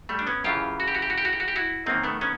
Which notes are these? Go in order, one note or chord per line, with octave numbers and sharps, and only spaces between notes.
G3 A3
D4
B3 C#4
F#2 C#3 E3 F4 G4
F#4
G4
F#4
G4
F#4
G4
F#4
G4
F#4
G4
E4 F#4
F#2 D#3 A#3 C4
A3 B3
B3 C#4